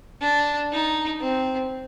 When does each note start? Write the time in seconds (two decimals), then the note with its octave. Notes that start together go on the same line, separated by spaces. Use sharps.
0.21 D4
0.72 D#4
1.21 C4